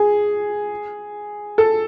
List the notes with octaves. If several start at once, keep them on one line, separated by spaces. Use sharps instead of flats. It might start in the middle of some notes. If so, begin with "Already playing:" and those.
Already playing: G#4
A4